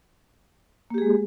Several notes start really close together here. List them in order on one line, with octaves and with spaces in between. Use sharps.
A#3 G4 G#4 G#3